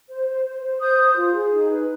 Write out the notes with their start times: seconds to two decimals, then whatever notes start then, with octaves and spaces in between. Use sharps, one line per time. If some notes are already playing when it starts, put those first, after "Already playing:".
0.10 C5
0.28 C5
0.45 C5
0.62 C5
0.81 C5 D#6 G6
0.99 C5
1.16 F4
1.34 G#4
1.52 D#4
1.70 B4